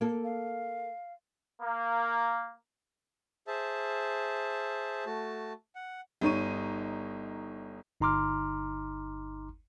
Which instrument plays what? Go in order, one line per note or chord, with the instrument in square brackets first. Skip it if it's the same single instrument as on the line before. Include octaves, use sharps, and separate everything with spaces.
[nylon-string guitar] A#3 A4
[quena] F5
[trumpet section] A#3
[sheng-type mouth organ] G#4 C5 E5 A5
A3 F#4 A5
F#5
[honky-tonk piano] G1 D#4 C#5 D#7
[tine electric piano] G1 D#4 A#5 C6 D6 F6